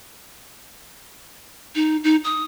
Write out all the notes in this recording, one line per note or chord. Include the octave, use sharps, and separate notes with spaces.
D#4
D#4
D#6